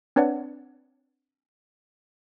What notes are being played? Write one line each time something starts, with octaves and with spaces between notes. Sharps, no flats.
C4 D4 B4 C#5 D5 F#5